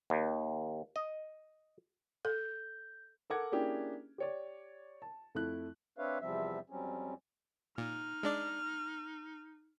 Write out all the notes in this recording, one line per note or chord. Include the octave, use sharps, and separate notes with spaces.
D#2
D#5
A4 G6
A4 A#4 F#5 D6 G#6
A#3 C#4 D4 E4 G4 G#4
G4 C#5 D5
A5
F2 A3 E4 F#6
C4 D4 B4 C#5 E5 F5
E2 C3 F3 G3 C4 E5
F2 F#3 G3 C4 C#4
A#2 D#4 F6
G#3 D4 D5